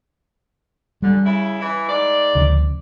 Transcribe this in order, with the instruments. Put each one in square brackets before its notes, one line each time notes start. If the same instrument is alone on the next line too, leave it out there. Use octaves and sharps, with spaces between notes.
[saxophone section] A#2 D3 [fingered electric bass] G3
[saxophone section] C#3 E4
E3 E4
G#2 D5
[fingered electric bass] D2 C#3 F3